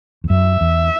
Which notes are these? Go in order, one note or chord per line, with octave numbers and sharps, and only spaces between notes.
E2
F#2 E5
E2